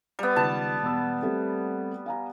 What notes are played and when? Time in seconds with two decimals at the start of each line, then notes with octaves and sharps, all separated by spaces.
0.19 G3 B3
0.36 C#2 D#3 A5
0.82 E1 B3 E6
1.22 G3 A3 C4
2.06 F5 G#5 A#5